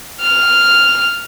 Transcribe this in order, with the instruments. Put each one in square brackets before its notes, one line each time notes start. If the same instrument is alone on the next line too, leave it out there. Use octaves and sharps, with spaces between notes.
[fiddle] F6